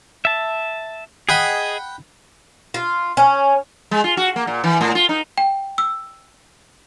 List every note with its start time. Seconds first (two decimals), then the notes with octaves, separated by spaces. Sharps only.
0.25 E5 A5
1.29 G#4 D#5 F#5 G5 B5
2.74 F4
3.17 C#4
3.91 G#3
4.04 F4
4.17 F#4
4.36 A#3
4.47 A#2
4.64 E3
4.81 A2
4.95 F4
5.09 D#4
5.38 G5
5.78 E6